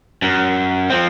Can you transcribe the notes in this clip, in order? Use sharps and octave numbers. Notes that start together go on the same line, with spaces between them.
F#2
F3 C4